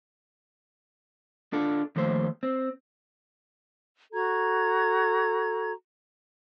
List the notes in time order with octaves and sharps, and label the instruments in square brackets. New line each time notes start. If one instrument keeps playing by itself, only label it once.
[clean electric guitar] D4 F4 A4
D#2 F3 A3 C5
C4
[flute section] F#4 A4 A#5 G#6